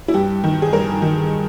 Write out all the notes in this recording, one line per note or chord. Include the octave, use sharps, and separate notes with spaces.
E4
G2 G4
D#3
G#4
G2 A#4
D#3